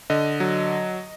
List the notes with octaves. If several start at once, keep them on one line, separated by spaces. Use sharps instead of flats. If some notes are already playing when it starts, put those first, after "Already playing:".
D3 D#5
F#3